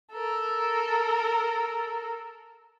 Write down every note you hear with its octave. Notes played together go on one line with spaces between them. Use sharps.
A4 A#4